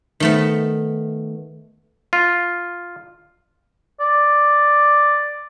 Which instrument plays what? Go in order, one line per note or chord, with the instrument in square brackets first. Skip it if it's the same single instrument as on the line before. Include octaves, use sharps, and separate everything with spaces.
[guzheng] D#3 A3 B3
[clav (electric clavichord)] F4
[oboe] D5